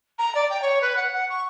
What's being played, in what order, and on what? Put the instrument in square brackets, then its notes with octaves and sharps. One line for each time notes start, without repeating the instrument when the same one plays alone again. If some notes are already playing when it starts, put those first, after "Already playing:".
[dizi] A#5
D5
G5
C#5
B4
F#5
F#5
C#6